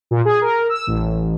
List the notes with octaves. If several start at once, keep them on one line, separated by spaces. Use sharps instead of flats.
A#2
G#4
A#4
E6
A1